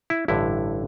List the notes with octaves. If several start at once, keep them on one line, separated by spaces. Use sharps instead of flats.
E4
A1 G2 D3 E4